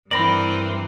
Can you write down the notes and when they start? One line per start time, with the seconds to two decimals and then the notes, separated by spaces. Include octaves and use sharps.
0.11 G2 E3 C4 A#4 D5 B5 A#6 F#7